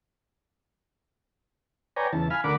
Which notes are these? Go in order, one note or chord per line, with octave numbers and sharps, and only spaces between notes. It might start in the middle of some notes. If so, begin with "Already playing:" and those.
B4 C#5 D5 G5 G#5 A#5
E2 C#3 E3 A5
F5 G#5 B5 F6
D2 D3 A#4 F#5 B5 D6